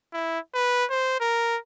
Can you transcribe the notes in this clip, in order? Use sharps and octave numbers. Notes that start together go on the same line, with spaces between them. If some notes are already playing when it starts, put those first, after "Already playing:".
E4
B4
C5
A#4